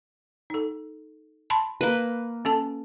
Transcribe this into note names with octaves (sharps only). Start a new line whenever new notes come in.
D#4 A4
A5 B5 C6
A#3 B4
C#4 A4 A5